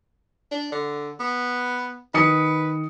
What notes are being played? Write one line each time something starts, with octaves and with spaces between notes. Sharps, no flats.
D4
D3
B3
D#3 B4 D#6 C#7